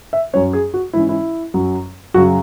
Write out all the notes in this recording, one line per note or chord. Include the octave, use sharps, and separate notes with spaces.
E5
F#2 F#3 C#4 C#5
G#4
F#4
G#2 E3 C#4 E4
E4
F#2 F#3 C#4
F#2 C#3 F#3 C#4 F#4